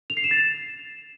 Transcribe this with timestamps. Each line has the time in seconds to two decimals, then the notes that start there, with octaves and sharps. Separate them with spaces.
0.10 F7
0.17 C7
0.24 E7
0.31 A6
0.38 E7